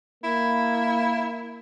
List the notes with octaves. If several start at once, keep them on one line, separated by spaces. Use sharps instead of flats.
A#3 E4